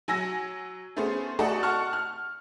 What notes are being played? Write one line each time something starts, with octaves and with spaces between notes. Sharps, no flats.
F#3 G#5 E6 A#6
A3 B3 C#4 G#4 C5
A3 F#4 A4 D5 D#5
F#5 A5 C#6 F6
F6